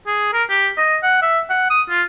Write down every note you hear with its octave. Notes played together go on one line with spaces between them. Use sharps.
G#4
A#4
G4
D#5
F#5
E5
F#5
D#6
F4